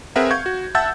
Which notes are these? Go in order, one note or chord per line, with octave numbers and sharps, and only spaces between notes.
C4 G#4 A#4 B4 E5 F#5
F5 C#6 G6 G#6
F#4
E5 F#5 A5 E6 G6 A6